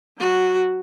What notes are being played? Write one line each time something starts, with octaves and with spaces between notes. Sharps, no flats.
F#3 F#4